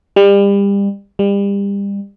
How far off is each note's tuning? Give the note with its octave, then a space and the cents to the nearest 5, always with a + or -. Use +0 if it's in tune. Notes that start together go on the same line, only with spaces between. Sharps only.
G3 +30
G3 +30